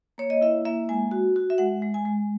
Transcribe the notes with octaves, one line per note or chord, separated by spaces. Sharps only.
A#3 C#5
D#5
E4 E5
A#3 E5
G#3 G#5
F#4
F#4
E5
G#3 F#5
G#3
G#5
G#3